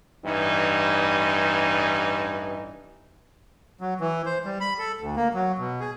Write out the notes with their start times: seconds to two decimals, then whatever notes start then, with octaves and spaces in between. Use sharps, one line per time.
0.25 A1 G2 E3 D#4
3.81 F#3
4.00 E3
4.26 C5
4.45 G3
4.61 B5
4.79 A4
5.01 D2
5.16 A#3
5.34 F#3
5.58 B2
5.80 G#4